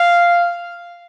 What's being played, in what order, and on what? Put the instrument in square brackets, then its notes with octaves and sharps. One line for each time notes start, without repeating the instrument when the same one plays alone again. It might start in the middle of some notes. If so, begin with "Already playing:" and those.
Already playing: [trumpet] F5